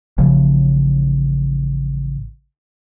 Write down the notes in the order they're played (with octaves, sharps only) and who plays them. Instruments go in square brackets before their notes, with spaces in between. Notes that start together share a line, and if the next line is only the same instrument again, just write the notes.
[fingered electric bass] A1 C#3 F3